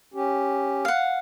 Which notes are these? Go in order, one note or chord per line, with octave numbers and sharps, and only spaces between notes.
C#4 G4
F5 F#5